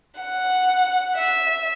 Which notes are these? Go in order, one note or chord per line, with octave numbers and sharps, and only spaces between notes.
F#5
E5